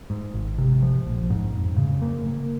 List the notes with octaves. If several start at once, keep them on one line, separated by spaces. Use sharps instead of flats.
G#2
G#1
C3
F3
A#1
G#2
F2
C#3
A#3
A#3